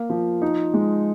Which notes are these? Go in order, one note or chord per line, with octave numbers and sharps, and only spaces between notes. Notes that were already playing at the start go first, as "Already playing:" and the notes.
Already playing: A#3 F5
F3
D#4
G#3